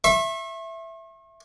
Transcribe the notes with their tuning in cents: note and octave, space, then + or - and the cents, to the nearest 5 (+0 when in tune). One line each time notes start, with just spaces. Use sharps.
E5 +5 C#6 -45